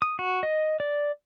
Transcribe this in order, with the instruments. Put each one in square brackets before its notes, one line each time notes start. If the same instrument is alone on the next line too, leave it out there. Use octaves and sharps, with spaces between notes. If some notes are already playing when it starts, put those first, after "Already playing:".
[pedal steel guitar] D#6
F#4
D#5
D5